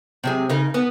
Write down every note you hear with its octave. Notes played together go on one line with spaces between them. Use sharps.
C3 F#3 G#3
C#3 D#4 A#4
B3